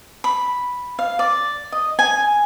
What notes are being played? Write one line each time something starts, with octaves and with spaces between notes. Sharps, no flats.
B5
F5
D5
D#5
G#5